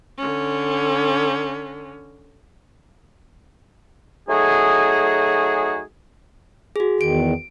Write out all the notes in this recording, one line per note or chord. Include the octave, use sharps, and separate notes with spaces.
D3 C#4
F#3 A3 D#4 F#4 G#4
F#4 G#4
E2 D#3 D7